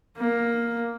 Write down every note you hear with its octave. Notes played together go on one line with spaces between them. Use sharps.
A#3